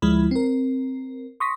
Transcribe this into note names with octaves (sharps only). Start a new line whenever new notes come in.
D2 F3 G#3 E4 B5
C4 A#4
C6 C#6 D#6 A#6 B6